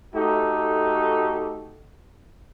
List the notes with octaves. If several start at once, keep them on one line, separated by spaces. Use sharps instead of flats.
A3 D#4 F#4 G4 A4